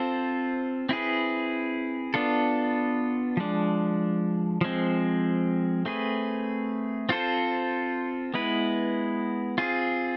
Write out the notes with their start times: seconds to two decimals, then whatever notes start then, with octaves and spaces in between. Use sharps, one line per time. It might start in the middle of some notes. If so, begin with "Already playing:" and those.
Already playing: C4 F4 A4 C5
0.89 C4 E4 G#4 B4
2.14 B3 D4 F4 A4
3.37 F3 G#3 D4
4.61 F3 G#3 C4
5.86 A3 C4 G#4 B4
7.09 C4 F4 A4 C5
8.34 G#3 B3 E4 B4
9.58 C4 F4 G#4